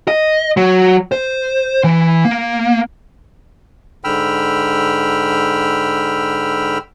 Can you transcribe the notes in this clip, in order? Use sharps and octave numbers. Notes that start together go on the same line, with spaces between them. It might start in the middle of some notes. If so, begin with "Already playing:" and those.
D#5
F#3
C5
E3
A#3
G#2 D3 G5 B5 E6 F6